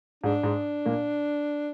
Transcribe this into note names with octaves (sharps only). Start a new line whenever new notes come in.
G#2 G#3 D4
G#2 G#3
A#2 A#3